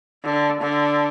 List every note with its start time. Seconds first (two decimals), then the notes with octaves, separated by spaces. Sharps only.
0.24 D3
0.61 D3